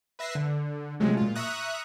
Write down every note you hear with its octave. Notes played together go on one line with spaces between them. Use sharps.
B4 E5 A#6 C7
D3
C3 F3 F#3 G#3 A3 C#4
A#2 F4
E5 A#5 C#6 D#6 F#6